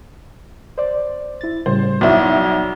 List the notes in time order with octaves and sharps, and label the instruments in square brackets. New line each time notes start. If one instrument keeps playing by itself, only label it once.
[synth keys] C5 D5
E4 A6
[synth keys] A2 C#3 G3 [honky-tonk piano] C5
[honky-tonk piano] B1 E4 [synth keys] F#4 D5